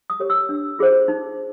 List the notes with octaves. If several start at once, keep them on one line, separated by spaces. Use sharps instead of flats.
D#6
G4 A#4 C#5
E6
D4
F4 G#4 C5
D#4